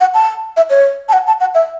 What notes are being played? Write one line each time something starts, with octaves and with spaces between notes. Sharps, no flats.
F#5
A5
E5
C#5
A5
F#5
A5
F#5
E5